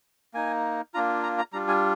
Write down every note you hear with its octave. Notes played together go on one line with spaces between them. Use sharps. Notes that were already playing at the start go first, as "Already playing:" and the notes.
A#3 D#4 G#5
A#3 D4 F4 A#5
A#5
A#5
G3 D4 F4 A#5
G#5